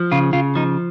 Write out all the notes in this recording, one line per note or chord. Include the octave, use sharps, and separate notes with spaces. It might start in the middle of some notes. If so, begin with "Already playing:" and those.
Already playing: F3
C#3 F4
C#3 F4
F3 D#4